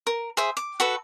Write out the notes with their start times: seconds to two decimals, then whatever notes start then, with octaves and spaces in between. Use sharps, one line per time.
0.07 A#4
0.37 G#4 C5 E5
0.57 D6
0.80 F#4 A4 B4